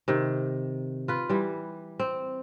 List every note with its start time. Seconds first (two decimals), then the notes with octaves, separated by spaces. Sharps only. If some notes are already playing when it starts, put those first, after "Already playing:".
0.08 C3 D#3
1.08 F4 B4
1.29 E3 G3
1.99 C4